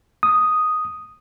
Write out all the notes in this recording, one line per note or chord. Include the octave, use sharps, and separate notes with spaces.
D#6